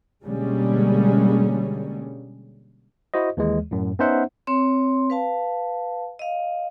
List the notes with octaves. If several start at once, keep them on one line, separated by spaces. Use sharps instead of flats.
B2 D3 G3 G#3 A#3 C#4
E4 F#4 C5 D#5
D#2 E3 G#3
F#2 A2
B3 C#4 D#4 C5 E5 F#5
C4 C#5 C6
B4 F5 A5
D#5 F5